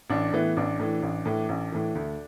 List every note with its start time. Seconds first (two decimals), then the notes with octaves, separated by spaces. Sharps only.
0.10 A1 D4
0.32 A2 E3 B3
0.57 A1 D4
0.79 A2 E3
1.02 A1
1.26 A2 E3
1.49 A1
1.72 A2 E3
1.95 D2